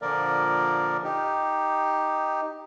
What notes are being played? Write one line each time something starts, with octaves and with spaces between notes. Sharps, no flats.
A#2 D3 F3 A#3 A#4 D5
D#4 G4